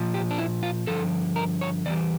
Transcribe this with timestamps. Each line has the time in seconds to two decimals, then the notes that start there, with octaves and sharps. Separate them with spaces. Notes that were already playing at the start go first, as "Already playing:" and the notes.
Already playing: A#2 F3
0.14 G4
0.31 D4
0.38 E4
0.63 F4
0.87 G2 D3 F3 A4
1.36 A#4
1.61 C#5
1.86 E2 E3 G3 D5